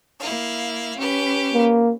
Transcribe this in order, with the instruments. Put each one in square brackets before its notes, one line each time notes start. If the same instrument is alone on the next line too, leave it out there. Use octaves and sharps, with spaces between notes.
[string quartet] A#3 E4 F5
C#4 G4 B4
[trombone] A#3